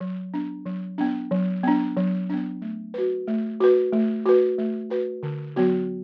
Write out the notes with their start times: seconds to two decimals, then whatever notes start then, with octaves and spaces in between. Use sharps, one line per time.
0.01 F#3
0.34 B3 D4
0.66 F#3
0.98 B3 D4
1.31 F#3
1.63 B3 D4
1.97 F#3
2.30 B3 D4
2.62 A3
2.94 F#4 B4
3.27 A3
3.60 F#4 B4
3.93 A3
4.26 F#4 B4
4.58 A3
4.90 F#4 B4
5.23 D3
5.56 F#3 B3 F#4